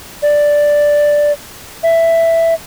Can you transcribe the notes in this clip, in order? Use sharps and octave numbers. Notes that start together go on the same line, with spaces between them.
D5
E5